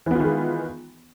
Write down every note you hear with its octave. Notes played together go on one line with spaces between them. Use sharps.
D#3 E3 G#3 B3 F4